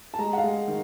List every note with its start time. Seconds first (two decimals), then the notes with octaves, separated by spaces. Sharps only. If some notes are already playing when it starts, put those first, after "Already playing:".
0.14 A5
0.18 G#3 A#5
0.33 F#5
0.38 F5
0.44 G#3
0.68 D#3